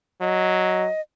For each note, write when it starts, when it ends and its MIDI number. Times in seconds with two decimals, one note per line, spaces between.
0.21 0.88 54
0.21 1.01 75